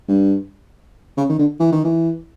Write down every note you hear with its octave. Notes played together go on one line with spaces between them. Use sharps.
G2
C#3
D#3
D3
E3
D#3
E3